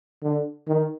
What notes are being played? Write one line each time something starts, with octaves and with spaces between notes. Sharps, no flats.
D3
D#3